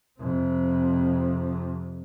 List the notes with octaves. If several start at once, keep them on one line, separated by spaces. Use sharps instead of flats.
F2 C3